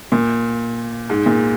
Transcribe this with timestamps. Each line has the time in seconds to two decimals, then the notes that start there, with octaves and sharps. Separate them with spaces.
0.12 A#2
1.10 G#2
1.26 A#2